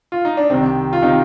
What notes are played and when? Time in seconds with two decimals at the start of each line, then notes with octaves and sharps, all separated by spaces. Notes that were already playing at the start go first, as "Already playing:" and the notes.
0.12 F4
0.25 D#4
0.37 D4
0.50 C2 C3 D#3 C4
0.93 F4
1.02 C3 D#3 D#4